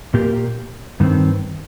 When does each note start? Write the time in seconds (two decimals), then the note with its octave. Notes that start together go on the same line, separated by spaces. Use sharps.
0.14 A#2 A#3 G4
1.00 G2 D#3 C4